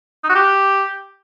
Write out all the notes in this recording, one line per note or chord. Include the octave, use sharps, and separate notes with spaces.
D#4
F#4
G4